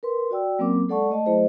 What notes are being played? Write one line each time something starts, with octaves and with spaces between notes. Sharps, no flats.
A#4 B4 C6
F#4 D5 G5 E6
F#3 A#3 C4 C#4 A#4 D6
G#3 A4 D5 F#5 A5 C#6
A3 D#5 A5
F#3 A3 E4 G#4 C5 D#5